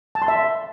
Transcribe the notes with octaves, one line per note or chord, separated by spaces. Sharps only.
A5
C6
E5